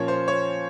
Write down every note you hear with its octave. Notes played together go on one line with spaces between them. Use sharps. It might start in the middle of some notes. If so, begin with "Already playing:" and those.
Already playing: A#2 F3 A#3 C#4 C#5
C5
C#5